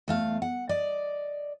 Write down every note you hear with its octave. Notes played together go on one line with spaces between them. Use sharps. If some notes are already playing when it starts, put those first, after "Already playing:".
E2 A3 F5
F#5
D5 D#5